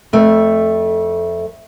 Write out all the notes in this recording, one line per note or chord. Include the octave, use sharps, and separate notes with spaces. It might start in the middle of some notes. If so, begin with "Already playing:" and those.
F2 A3